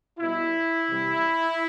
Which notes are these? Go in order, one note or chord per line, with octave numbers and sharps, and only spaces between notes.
B2 G3 E4
C3 E3 G3